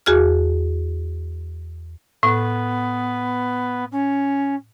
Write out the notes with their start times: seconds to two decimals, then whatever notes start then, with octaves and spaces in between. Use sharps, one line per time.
0.06 E2 F#4 G#4 F6
2.23 A2 B3
3.92 C#4